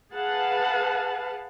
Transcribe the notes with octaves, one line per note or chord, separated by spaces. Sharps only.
G#4 B4 F5 F#5 A5